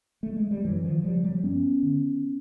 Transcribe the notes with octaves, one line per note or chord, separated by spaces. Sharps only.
A3
G#3
G3
F#2 E3 F#3
D#3 F3
C#3 F3 G3
F3 G3
G2 B3 C#4
D3